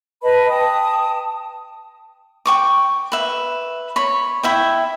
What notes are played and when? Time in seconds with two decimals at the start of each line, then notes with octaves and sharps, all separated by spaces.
0.22 B4 D#5 A5 B5
0.49 G5 A5 D#6
2.46 G5 C#6 D6
3.12 B4 E5
3.96 C#5 B5
4.43 E4 E5 G5